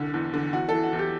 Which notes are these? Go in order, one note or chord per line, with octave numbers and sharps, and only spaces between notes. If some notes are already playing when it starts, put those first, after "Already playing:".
Already playing: C2 D3
E2
D3
E2 F#4
E3 A4
F#4
E2
G4